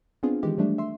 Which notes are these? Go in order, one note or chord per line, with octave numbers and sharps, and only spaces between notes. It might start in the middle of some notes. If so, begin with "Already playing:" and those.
B3 C4 D4 F4 G#4
D#3 E3 G#3 G4
F3 G3 A3 D4
E5 C6